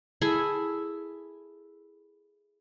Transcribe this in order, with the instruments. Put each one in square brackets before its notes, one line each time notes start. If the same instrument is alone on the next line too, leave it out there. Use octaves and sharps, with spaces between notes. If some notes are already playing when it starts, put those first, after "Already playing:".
[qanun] E4 G#4 A4 E5